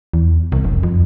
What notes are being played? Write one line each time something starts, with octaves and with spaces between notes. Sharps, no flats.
E2
C2
F1
F2